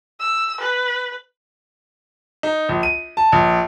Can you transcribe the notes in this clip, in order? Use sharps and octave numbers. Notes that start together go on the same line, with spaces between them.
E6
B4
D#4
A#1
D#7
A5
A#1